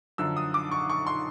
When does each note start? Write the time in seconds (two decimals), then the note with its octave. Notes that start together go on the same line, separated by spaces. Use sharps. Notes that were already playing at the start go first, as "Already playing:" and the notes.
0.18 F#2 D3 F3 E6
0.36 D#6
0.54 D6
0.71 C#6
0.90 C#6
1.07 C6